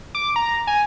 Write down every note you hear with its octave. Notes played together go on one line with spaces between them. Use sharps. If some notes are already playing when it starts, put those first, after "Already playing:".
D6
A#5
G#5